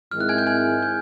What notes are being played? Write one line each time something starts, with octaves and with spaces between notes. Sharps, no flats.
G#2 D#3 G#3 C4 E4 F6
F#6
G#5 G#6
G6
G#5 G#6
G6